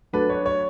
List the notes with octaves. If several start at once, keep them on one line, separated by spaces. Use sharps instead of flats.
F#3 A3 D4 F#4 A4 B4
C#5
C#5